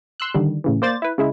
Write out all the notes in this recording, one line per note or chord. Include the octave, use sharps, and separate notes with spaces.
C6 E6 F#6
D3 D#3 G3
A2 C#3 E3
A#3 C5 D5 A6
E4 B4
C#3 G#3 E4